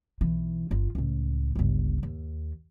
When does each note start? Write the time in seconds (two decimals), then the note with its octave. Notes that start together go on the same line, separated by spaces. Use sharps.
0.21 B1 E3
0.71 G1 F4
0.95 C#2 A2
1.55 G1 C#2
2.03 D#2